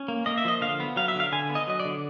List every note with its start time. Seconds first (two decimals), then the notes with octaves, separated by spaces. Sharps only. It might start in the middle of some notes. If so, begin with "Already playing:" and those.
Already playing: C#4
0.08 A#3
0.26 A#3 D#5
0.38 E5
0.45 F3 D#5
0.61 D3 F5
0.80 B3
0.96 F#3 F5
1.08 E5
1.15 D3
1.20 F5
1.32 D3 G#5
1.49 B3
1.55 D#5
1.67 F#3 D#5
1.80 D5
1.85 D3